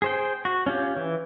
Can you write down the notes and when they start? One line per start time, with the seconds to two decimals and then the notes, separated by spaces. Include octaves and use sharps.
0.02 G#4 C5 G5
0.45 F#4
0.66 C#4 F4 G4
0.97 E3